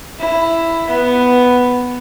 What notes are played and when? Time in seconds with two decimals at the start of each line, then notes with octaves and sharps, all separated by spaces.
0.19 E4
0.90 B3